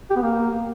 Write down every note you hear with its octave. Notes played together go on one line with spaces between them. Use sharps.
G4
B3
A#3